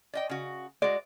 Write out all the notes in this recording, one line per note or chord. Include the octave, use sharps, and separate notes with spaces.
D5 D#5 G5
C#3 F#4
G#3 F#4 D5